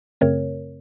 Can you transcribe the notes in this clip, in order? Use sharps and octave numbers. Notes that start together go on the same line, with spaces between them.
F#2 C#3 A3 C4 A#4 C#5